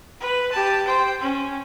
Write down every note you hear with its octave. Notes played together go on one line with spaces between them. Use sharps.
B4
G4 A5
C5 G5
C#4